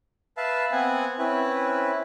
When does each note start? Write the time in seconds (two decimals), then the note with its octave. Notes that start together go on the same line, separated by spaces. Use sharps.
0.37 B4 E5 F5 A5
0.72 B3 C4 F#5 G#5
1.18 C4 C#4 E4 B4